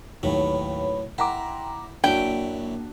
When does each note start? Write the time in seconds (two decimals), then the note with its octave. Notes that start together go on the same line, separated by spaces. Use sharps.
0.23 D#2 A2 F#3 B4 C#5 B5
1.18 E4 F#5 G5 A#5 C6 D6
2.04 F#2 F#3 A#3 D4 E4 F#4 G5